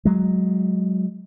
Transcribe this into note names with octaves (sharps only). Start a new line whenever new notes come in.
F#3 G#3